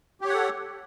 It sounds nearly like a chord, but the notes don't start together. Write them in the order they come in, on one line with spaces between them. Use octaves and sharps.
G4 C#5 F#5 A4